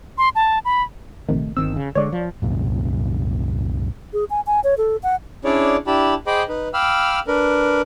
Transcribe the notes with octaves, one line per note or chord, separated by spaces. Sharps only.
C6
A5
B5
A#1 C3 D#3 A3
G1 D#3 C4 E6
C#3
D3 G#3 C#5 D5
F3
C2 F#2 A#2
G#4
G#5
G#5
C#5
A4
F#5
C#4 D4 E4 G#4 C#5 D5
D4 E4 G4 A5 B5
G#4 C5 D#5 G5 B5 D6
D#4 B4
F5 G5 B5 D6 E6 F6
D4 A#4 B4